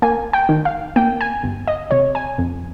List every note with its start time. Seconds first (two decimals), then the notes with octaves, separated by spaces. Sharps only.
0.02 A#3 G#5
0.33 G5
0.49 D#3
0.65 F5
0.96 A#3 G5
1.21 G#5
1.43 G1
1.67 D#5
1.91 C3 C#5
2.15 G#5
2.38 F2